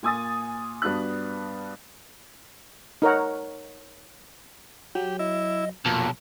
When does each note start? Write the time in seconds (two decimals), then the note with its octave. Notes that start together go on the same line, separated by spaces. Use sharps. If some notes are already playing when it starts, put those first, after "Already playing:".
0.03 A#2 G#5 D#6 A6
0.82 G2 B3 D4 F#4 F#6
3.02 D#4 A#4 C#5 F#5
4.95 F#3 G4
5.19 E4 D#5
5.86 B1 F2 A#2 A5